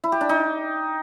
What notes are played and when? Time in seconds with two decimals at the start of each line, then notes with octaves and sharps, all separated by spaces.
0.04 E4
0.12 G4
0.21 D4
0.29 D#4